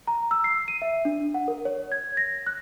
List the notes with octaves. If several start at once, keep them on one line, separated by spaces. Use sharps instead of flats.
A#5
E6
C7
D#7
E5
D4
F#5
A#4
C#5
G#6
A#6
F#6